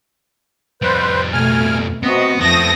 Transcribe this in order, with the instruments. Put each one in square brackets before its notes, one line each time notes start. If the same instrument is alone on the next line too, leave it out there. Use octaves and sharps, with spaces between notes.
[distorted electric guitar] F2 G3 [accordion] B4 C5
[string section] B2 A3 [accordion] G#5 F6
[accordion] C3 D#5 [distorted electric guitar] B3 [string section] C4 F#4
[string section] F2 D#6 A#6 [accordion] A3 A5 [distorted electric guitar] B3 C4